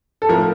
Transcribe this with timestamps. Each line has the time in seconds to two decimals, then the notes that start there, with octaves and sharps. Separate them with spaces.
0.22 A4
0.29 A2 F3 A#4